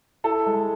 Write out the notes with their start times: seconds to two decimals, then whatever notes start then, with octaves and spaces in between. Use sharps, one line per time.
0.24 E4 A4
0.47 G#3